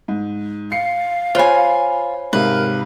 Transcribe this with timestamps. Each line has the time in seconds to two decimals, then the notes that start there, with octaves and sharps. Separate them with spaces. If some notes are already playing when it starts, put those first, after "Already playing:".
0.08 G#2
0.72 F5 C7 C#7
1.35 F4 C5 C#5 G#5 B5
2.33 G#2 C3 A#4 B4 F5